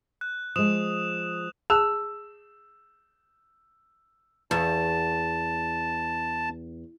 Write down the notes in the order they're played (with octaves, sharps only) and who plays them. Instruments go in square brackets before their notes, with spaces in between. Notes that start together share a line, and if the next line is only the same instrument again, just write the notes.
[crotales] F#6
[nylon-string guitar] F3 G#3 [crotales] D#6 E7 F7
[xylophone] G#4 A5 F#6 [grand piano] E6
[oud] E2 [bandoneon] A5